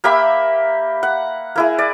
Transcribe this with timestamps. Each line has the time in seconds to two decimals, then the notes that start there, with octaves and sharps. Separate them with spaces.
0.04 A#3 G4 E5 B5
1.03 F#5
1.56 A#3 E4 G#4
1.79 D5